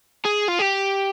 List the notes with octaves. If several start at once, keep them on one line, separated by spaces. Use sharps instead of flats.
G#4
F4
G4